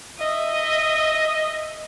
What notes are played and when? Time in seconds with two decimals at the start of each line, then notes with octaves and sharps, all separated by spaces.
0.20 D#5 E5